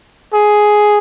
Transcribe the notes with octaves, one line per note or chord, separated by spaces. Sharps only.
G#4